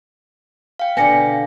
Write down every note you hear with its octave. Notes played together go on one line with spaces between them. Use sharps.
F5 G5
B2 D3 B3 G#5 A#6 C#7